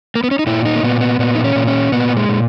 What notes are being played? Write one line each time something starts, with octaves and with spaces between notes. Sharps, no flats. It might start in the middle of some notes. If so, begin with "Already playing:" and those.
A#3
B3
C#4
D#4
A#2 E4
D#4
A#3
A#2 B3
B3
A#2 B3
D#4
C#4
A#2
C#4
A#2 B3
G#3
A#2